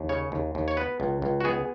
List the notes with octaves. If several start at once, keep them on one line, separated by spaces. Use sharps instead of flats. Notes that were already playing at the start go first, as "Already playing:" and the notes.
Already playing: D#2
C#3 C#5
D#2
D#2
C#5
B3 B4
C#2
C#2
F#4
B3 G#4